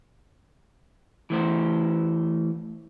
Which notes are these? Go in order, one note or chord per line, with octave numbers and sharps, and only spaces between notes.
E3 A3 C5